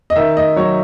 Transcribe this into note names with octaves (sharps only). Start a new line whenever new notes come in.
D#5
D#3 E5
D#5
F#3 C#5